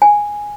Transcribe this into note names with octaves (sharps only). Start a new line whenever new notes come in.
G#5